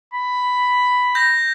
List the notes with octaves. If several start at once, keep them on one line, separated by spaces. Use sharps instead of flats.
B5
G6 A#6